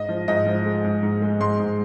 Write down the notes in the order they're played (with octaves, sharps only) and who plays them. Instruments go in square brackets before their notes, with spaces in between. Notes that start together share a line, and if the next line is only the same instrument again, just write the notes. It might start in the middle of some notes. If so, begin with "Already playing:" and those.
Already playing: [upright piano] G#2 D#5
F3
G#2 D#5
F3
G#3
G#2
G#2
G#3
G#2 C6
G#2